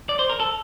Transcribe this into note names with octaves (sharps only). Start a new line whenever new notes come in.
D5
C5
A#4
A4